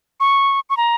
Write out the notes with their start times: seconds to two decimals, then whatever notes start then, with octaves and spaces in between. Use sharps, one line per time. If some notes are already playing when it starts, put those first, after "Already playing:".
0.20 C#6
0.70 C#6
0.77 A#5